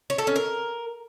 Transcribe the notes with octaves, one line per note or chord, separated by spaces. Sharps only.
C#5
A4
C#4
A#4